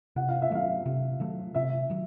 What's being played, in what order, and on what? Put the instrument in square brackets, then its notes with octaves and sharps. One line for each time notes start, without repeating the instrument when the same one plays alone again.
[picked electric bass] C3 [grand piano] F#5
[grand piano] F5
E5
[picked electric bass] D#3 F#3 A3 [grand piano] F5
[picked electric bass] C3
D#3 F#3 A3
[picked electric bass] C3 [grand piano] E5
[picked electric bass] D#3 F#3